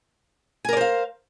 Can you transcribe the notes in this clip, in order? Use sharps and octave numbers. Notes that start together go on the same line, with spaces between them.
A#4 C5 D5 F5 G#5